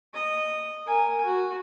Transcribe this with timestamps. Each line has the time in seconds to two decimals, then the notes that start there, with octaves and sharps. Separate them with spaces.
0.14 D#5
0.86 A#4 G#5
1.25 F#4